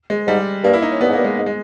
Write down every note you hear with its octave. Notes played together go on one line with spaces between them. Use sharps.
G#3
G#2 G3
G2 A#3
E4
D#4
C#4
G2 B3
G#2
G2 A#3
G#3
G#2
G#3